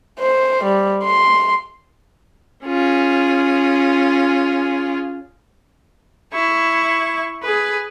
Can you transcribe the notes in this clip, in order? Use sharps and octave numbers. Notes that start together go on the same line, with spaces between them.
C5
G3
C6
C#4 F4 G#4
E4 C#6
G#4 B4